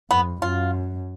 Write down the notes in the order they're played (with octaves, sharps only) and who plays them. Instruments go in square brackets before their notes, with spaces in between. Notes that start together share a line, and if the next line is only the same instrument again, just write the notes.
[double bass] F2 [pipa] B3
[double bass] F#2 [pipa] F4